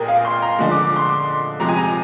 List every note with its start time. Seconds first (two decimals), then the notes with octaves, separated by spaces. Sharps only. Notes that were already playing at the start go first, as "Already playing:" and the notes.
Already playing: A#2 G#3 G#4 A#4 G5 G#5
0.08 F5
0.25 C6
0.42 A#5
0.59 D3 F3 G#3
0.71 D6
0.84 D6
0.96 C6
1.60 C3 F3 G#3 A#5
1.69 G#5
1.77 A#5